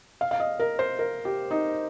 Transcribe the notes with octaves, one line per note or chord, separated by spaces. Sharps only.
F5
F5
D#5
A#4
C5
A#4
G4
D#4